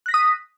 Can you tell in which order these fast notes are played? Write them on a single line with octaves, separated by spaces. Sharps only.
F#6 A#6 B6 D#6